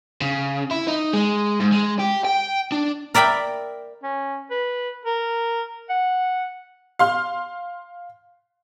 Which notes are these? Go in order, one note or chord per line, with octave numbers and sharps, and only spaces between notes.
C#3
E4
D#4
G#3
G#2
G#3
G4
G5
D4
A#4 D5 E5 G5 B5
C#4
B4
A#4
F#5
F5 C6 F6